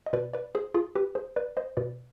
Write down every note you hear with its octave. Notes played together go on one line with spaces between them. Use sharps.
D#5
B2 B4 D5
B4 D5
G#4 C5
F4 G#4
G4 B4
G#4 C5
B4 D5
C5 D#5
B2 B4 D5